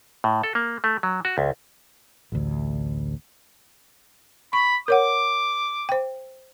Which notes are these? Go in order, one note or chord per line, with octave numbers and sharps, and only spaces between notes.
A2
A4
A#3
A3
F#3
F#4
C#2
A1 D2
B5 C#6
A#4 C#5 F#5 D6
C5 G5